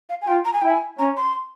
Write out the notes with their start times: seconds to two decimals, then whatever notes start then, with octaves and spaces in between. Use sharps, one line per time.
0.09 F5
0.22 G#5
0.27 F4 G5
0.45 A#5
0.53 G#5
0.62 E4 G5
0.70 G#5
0.99 C#4 A#5
1.17 C6